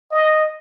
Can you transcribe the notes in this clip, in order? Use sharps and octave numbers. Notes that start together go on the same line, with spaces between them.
D#5